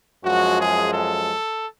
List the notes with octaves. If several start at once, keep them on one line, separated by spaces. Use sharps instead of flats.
F#2 F3 G#3 F#4
G#4
A4